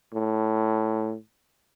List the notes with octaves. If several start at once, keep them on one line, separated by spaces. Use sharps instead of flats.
A2